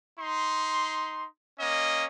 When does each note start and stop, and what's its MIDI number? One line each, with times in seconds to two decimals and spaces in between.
0.18 1.26 63
0.18 1.26 84
1.60 2.05 58
1.60 2.05 61
1.60 2.05 75